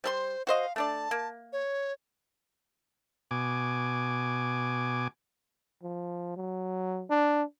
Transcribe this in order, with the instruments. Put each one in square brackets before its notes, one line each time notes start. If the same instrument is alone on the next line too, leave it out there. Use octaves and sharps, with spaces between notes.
[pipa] G3 A4 C6 [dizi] C5
[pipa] F#4 C5 D#5 [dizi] F5
[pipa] A3 D4 D5 [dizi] A5
[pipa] A#3
[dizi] C#5
[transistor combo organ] B2 G#5 D6
[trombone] F3
F#3
D4